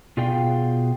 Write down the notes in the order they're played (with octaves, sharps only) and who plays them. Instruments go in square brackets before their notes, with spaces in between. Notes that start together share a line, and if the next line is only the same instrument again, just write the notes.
[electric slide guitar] B2 F4 G#4 D5 F5 G5